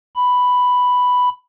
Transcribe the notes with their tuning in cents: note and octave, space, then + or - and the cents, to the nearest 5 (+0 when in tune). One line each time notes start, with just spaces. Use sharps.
B5 +5